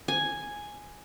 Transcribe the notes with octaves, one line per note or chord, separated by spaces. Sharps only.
G#5